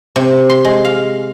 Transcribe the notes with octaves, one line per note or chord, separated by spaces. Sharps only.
C3
C6
G#3
F5